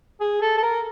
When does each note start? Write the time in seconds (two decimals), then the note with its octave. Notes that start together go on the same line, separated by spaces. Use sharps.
0.20 G#4
0.42 A4
0.57 A4
0.63 A#4